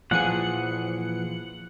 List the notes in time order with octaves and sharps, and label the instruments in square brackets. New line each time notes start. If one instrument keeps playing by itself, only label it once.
[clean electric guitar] A#2 E3 G#4 [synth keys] F3 C#7 [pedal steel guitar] F#5